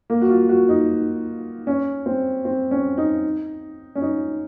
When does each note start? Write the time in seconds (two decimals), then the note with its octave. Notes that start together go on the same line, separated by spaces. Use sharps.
0.10 A#3
0.21 F#4
0.30 F4
0.49 F#4
0.69 D#4
1.67 C#4
2.06 C4
2.45 C4
2.71 C#4
2.98 D#4
3.95 C#4
4.02 D#4